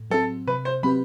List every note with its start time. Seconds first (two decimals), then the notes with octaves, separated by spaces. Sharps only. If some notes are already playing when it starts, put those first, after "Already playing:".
Already playing: A2
0.10 F#3 C4 A4
0.47 C3 B4
0.65 C5
0.83 F#3 C4 G4 B4 B5